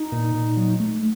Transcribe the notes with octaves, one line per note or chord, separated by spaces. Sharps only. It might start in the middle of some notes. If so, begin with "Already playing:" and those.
Already playing: D#4
A#2
A#2
F#3
A3